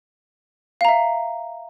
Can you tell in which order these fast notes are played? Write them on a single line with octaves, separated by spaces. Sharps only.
F5 A#5 E5